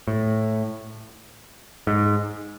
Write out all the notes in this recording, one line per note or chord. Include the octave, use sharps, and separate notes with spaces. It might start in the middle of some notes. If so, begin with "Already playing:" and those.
A2
G#2